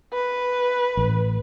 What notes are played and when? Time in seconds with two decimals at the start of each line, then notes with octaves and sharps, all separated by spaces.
0.13 B4
0.97 A1